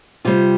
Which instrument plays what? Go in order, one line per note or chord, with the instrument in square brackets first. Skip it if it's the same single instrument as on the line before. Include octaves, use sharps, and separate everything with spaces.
[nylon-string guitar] C3 G3 C4 F4